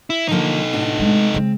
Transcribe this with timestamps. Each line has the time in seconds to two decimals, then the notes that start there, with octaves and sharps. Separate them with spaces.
0.10 E4
0.28 D3 F3 A#3 D#4 A4
0.73 A2 D4 F#4
0.99 G#3 A3
1.34 C#3 G#3 C4